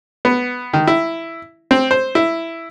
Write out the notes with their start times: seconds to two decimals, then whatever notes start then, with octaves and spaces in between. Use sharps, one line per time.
0.25 B3
0.73 D#3
0.87 E4
1.71 C4
1.91 C5
2.15 E4